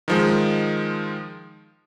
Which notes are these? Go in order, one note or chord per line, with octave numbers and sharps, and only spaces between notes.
D#3 F3 G#3